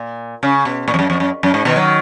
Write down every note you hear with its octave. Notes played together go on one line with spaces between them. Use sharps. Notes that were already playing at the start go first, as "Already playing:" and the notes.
Already playing: A#2
C#3
B2
A#2
F2
F#2
F2
F#2
F#2
G#2
B2 D#3
D#3 F#3